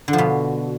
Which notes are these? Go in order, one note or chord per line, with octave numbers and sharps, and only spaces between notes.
D3
F3
B2